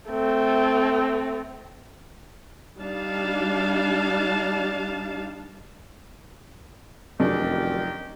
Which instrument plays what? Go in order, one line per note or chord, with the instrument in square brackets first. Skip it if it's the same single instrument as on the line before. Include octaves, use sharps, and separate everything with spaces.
[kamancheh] A3 C4
[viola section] G3 D4 D#4 F5 A5
[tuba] F1 [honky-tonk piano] F#2 G#3 D4 [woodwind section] D#3 G4